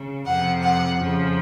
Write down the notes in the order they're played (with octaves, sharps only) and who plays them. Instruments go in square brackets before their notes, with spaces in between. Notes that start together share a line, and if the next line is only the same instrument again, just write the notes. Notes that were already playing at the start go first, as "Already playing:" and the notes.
Already playing: [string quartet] C#3
F2 C3 F3 F#5
F#5
F2 C#3 F3